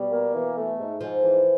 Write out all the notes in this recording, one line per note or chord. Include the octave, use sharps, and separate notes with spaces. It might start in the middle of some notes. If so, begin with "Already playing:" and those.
Already playing: B2 G3
A#3
E3
A3
G#2
G#2 F3
E3